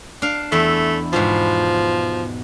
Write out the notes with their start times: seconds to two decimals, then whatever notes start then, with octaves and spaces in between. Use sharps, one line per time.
0.22 D4 F5
0.52 E2 A3 E4 E5
1.13 G#2 B2 F3 G4